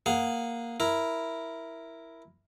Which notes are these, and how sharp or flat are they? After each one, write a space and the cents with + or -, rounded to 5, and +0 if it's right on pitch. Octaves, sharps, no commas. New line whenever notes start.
A#3 +0 G#4 +0 F#5 +0
E4 +0 A#4 +0